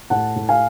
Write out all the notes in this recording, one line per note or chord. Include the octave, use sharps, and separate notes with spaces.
A2 F#5 A5
A2
F5 G#5